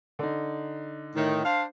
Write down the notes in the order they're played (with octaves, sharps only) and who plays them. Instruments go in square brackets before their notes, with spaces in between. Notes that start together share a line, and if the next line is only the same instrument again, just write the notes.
[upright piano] D3 D#4
[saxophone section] A2 D#3
D4 C5 F5